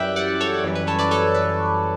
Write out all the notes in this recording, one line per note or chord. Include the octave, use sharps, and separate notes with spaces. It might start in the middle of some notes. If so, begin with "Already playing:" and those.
Already playing: F#2 E3 G3 E5 G5 D6 F#6
D5 F#5
A4 C#5
F#2 E3 G3
B4
A4 C#5
B4 D5
A4 C#5
B4